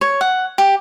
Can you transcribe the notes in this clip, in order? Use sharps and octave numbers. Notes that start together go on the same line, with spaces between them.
C#5
F#5
G4